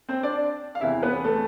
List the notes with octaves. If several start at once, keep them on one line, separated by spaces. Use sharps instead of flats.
C4 C5
D4 D5
F5
E2 C3 E3 E4 E5
B3 B4
A3 A4